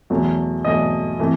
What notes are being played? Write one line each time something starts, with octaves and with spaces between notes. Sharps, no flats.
E2 B2 F#3 A3
E2 B2 F#3 A3 D#5
C3 E3 A3